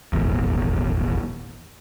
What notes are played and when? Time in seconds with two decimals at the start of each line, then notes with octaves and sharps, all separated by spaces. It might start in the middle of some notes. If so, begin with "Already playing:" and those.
0.13 D#1 G#1 E2